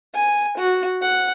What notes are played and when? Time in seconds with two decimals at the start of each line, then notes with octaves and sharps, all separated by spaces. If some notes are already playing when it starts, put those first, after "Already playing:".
0.15 G#5
0.57 F#4
1.02 F#5